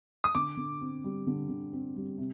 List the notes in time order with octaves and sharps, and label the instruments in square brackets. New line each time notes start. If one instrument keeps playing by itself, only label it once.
[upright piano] D#6
[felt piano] D3 [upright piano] D6
[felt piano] D3
C4
G3
D3
D3
C4
G3
C3